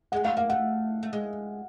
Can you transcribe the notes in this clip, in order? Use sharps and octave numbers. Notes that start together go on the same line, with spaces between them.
G#3 F#5
A3 F5
A#3 F5
A3 F#5
A3
G#3